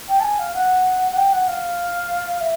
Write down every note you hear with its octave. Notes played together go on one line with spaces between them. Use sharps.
G5
A5
G#5
F5
F#5
F#5
G5
F#5
F5
E5